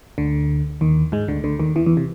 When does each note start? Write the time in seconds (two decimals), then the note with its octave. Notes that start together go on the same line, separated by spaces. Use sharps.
0.18 D2 D3
0.81 D#2 D#3
1.12 G#2 G#3
1.28 D2 D3
1.44 D2 D3
1.59 D#2 D#3
1.76 E2 E3
1.86 E2 E3
1.97 C3